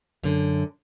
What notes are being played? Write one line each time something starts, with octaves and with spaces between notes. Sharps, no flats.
F#2 D3